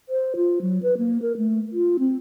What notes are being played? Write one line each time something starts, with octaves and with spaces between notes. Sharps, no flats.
C5
F4
F#3
B4
A#3
A#4
A3
F4
C4